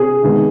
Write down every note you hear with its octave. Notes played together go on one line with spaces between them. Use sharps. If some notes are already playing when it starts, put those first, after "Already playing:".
Already playing: C3 C4 G#4
C3 D#3 G#3 B3